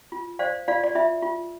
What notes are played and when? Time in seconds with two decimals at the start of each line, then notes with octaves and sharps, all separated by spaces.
0.12 F4
0.39 C5 D5 F5
0.68 F4 D5 F5
0.83 D5
0.95 F4 E5
1.23 F4